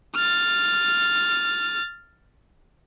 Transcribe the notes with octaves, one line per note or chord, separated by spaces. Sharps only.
F6 A6